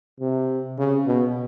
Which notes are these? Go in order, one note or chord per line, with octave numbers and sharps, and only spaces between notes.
C3
C#3
B2